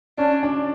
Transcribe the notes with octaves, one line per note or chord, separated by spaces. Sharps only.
C#4 D4
D4